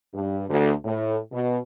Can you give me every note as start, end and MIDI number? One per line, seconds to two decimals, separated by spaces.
0.14 0.45 43
0.50 0.72 38
0.85 1.17 45
1.32 1.58 47